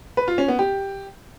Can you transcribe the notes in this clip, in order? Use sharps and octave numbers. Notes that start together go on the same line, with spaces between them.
B4
F4
C#4
B3
G4